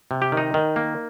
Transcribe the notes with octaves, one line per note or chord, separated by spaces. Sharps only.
C3
G4
D#3
D#4
D#3
A#3